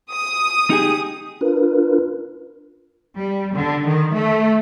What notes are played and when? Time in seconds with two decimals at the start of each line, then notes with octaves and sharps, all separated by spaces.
0.13 D#6
0.70 D#4 G4 G#4
1.41 D4 F4 A#4 B4
3.18 G3
3.55 D3
3.87 D#3
4.15 A3